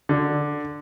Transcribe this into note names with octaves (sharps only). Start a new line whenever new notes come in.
D3